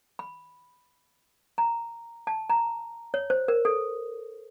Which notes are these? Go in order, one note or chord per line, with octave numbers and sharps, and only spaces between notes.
B5
A#5
A5
A#5
C#5
C5
A#4
A4